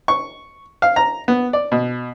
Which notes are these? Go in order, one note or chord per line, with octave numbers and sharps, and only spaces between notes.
C#6
F5
A#5
B3
D5
B2